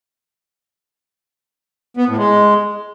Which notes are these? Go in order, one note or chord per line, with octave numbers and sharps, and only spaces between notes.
B3
A2
G#3